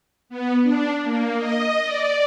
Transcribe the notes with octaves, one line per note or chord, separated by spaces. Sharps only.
B3
D4
A#3
D#5
D5